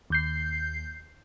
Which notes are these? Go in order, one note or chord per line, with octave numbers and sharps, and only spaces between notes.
D#2 G6 C7